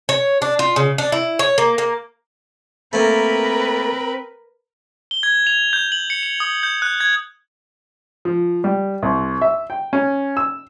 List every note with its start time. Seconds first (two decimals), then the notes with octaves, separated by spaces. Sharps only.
0.09 C#5
0.42 D4
0.59 F4
0.76 C#3
0.98 D4
1.12 E4
1.39 C#5
1.58 A#3
1.78 A#3
2.93 A3 A#3 C4 A#4 B4 B5
5.11 G7
5.23 G#6
5.47 F7
5.73 G6
5.92 F#7
6.10 C#7
6.23 F7
6.40 D#6
6.63 G6
6.82 F#6
7.00 G#6
8.25 F3
8.64 G3
9.03 C2
9.41 E5
9.70 G5
9.93 C#4
10.37 E6